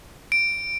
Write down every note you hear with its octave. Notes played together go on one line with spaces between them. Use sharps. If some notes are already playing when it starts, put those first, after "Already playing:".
D7